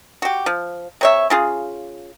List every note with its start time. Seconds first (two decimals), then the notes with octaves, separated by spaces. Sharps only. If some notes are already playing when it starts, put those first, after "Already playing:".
0.22 F#4 G4
0.46 F3
1.01 C3 C#5 E5
1.30 C#3 F4 G#4